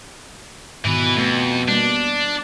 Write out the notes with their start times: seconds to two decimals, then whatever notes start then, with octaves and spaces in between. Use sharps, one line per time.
0.85 G#2 B2 D#3 E3 B4
1.17 F2 A3
1.69 G3 A#3 B3 D4